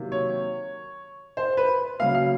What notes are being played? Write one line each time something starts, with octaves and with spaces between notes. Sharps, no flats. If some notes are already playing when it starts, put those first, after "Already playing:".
Already playing: C3 D#3 F#3 A#3
C#5
C5
B4
C#3 F#3 A#3 F5
F5